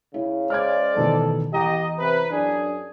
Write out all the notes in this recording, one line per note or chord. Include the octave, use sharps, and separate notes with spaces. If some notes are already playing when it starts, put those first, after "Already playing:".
C#3 E4
G#3 C5 D5 F6 G#6
A1 B2 D#3 A4
E2 G4 D#5 A#5
C3 B4
F#2 D4 G#4